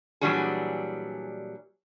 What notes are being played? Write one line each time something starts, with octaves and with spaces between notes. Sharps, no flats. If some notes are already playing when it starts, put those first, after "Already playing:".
A#2 E3 F#3 G3 D4 G#4